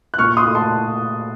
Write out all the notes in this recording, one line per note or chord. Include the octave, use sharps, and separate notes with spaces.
F#6
A#2 C#6 F6
C6 D#6
A3 D#4
A5 C6